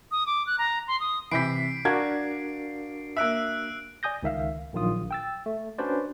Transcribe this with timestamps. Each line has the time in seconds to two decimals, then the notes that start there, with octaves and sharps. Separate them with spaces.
0.12 D#6
0.27 D6
0.47 F#6
0.58 A#5
0.88 C6
1.00 D#6
1.31 C3 E3 B5 G6 B6 C7 D7
1.85 D4 F#4 A#4 D5 F5 G#6
3.17 A#3 E5 E6 F#6 D7
4.03 D5 G#5 D#6 G6 A#6
4.23 C#2 D#3 E5 F5
4.73 A#1 D#3 F#3 F4 D#6
5.11 G5 E6 A6
5.46 A3
5.78 C#4 D4 F#4 B4 C5 D5